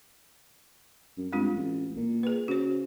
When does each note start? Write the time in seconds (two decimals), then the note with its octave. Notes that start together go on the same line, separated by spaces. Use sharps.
1.17 F#2
1.32 G2 G#3 C4 F4
1.55 A1
1.97 A#2
2.23 G#4 B4
2.48 C#3 F#4 C5